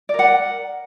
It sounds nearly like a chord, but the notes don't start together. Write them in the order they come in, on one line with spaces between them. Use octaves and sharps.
D5 A#4 F#5